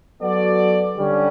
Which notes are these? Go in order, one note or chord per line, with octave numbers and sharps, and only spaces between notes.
F#3 B3 F#4 A4 D5
D3 G3 C#4